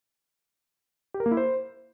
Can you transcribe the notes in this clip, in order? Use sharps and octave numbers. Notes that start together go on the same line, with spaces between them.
G4
A#4
A#3
E4
C5